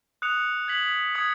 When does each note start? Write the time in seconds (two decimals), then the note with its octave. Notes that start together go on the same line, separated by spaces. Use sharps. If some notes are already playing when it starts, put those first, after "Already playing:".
0.22 D#6 F#6 C#7 F7
0.68 G#6 B6 F#7
1.15 D#6 G#6 C#7